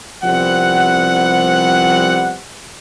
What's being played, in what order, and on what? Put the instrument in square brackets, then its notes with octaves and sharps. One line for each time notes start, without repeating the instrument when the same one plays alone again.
[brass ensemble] C2 F3 G3 B3 C4 F#5